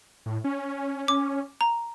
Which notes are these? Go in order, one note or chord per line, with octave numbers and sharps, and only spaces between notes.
A2
C#4
D6
A#5